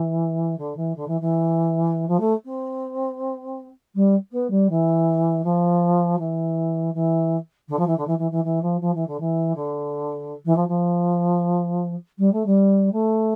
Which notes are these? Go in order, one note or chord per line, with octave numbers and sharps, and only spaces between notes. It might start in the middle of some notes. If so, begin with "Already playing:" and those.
Already playing: E3
D3
E3
D3
E3
E3
F3
A3
C4
G3
B3
G3
E3
F3
E3
E3
D3
F3
E3
D3
E3
E3
E3
E3
F3
F3
E3
D3
E3
D3
E3
F3
F3
G3
A3
G3
A3